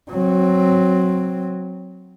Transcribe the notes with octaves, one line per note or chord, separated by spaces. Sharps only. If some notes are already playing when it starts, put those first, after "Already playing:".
F#3 C4